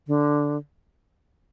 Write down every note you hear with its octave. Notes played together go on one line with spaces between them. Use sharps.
D3